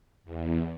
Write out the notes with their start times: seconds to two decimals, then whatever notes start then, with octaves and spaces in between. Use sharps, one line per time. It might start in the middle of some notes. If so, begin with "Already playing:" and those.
0.24 E2